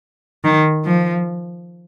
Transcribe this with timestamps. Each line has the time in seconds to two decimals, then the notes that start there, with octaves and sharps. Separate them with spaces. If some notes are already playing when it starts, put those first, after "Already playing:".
0.44 D#3
0.85 F3